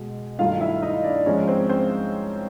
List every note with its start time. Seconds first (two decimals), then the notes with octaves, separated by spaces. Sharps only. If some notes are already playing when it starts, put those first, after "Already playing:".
Already playing: B2 G#3
0.38 G2 D#3 F#3 A3 F4 F5
0.61 E4 E5
0.82 D#4 D#5
1.04 D4 D5
1.15 D5
1.26 G#2 F3 G#3 C#4 C#5
1.48 C4 C5
1.69 C4 C5